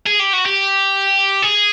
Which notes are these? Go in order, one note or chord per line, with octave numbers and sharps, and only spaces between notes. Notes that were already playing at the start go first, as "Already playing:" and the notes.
G#4
G4
F#4
G4
G#4